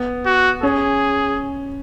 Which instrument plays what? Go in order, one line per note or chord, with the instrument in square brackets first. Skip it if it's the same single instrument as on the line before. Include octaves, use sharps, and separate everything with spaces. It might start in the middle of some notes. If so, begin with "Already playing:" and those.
Already playing: [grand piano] B3
[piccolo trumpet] F#4
[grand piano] C#4 [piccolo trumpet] G#4